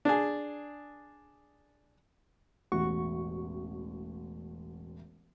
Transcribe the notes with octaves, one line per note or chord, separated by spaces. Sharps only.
D4 G#4
E1 A1 F#4 C#6